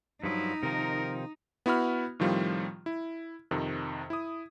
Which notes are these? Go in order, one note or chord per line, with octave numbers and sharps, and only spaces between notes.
G2 F3 F#3 D#4 E4
C3 D#3 F3 A#4
B3 E4 F#4 B5 F6
A2 D#3 F3 G3 C4 F4
E4
F2 C3 D#3
E4 D#6